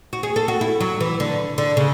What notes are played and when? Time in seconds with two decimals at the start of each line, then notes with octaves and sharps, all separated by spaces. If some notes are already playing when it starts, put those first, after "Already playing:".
0.13 F#4
0.23 G#4
0.36 A4
0.48 F#4
0.61 E4
0.81 F#3
1.01 E3
1.20 D3
1.58 D3
1.77 C#3